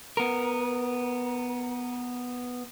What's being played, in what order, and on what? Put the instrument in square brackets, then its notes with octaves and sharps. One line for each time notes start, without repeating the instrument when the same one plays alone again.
[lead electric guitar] B3 A#4